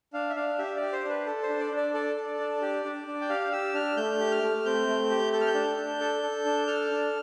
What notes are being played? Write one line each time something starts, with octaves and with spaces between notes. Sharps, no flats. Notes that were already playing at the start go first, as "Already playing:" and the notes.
D4 F5
E5
D4 F5
G4 E5
D5
G4
C5
D4
B4
A4
C5
D4
D5
D4
D5
A4 D5
A4
D4
G4
D4
D4
G5
G4 F5
G4 E6
D4 F6
A3 G6
G4
F6
A3
C4 G6
A3
G4
A4 G6
F6
G6
D4
D4
A4
A4
D4
A4 F6
D4